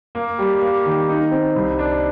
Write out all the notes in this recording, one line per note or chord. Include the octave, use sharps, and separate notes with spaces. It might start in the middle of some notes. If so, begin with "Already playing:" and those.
A#3
G3
A#3
D#3
D#4
C4
C2
D4